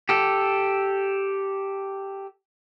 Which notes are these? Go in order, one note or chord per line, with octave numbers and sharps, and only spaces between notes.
G4 A4